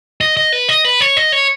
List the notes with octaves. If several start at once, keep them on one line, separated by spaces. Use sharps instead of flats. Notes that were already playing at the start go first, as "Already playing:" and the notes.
D#5
D#5
B4
D#5
B4
C#5
D#5
C#5